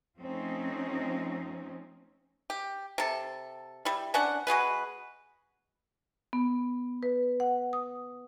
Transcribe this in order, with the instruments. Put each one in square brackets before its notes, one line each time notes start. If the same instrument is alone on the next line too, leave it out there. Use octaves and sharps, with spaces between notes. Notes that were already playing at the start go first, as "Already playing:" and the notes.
[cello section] F3 A3 C4 C#4 D#4
[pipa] G4
C3 A4
G3 E4
C#4 D4 F#5
G#3 F#4 G#4 B4
[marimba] B3
B4
F#5
D#6